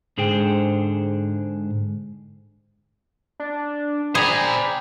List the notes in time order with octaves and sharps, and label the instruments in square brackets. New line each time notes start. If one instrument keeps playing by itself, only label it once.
[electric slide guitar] G#2 D3 G#4 C5 G5
[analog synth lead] D4
[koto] G#4 [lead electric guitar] C5 A#5 [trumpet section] D5 G5 [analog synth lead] B5